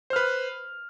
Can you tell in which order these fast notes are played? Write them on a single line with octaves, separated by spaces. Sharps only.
C5 F6 B4